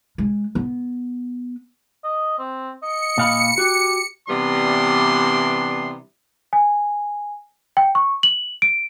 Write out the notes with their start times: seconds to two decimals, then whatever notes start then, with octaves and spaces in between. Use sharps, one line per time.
0.18 G#3
0.55 B3
2.04 D#5
2.39 C4
2.82 D#5 C#7
3.18 A#2 F5 B5
3.58 F#4 G4
4.28 C3 E3 G3 B3 D4 C6
6.53 G#5
7.77 G5
7.95 C#6
8.23 F#7
8.62 D7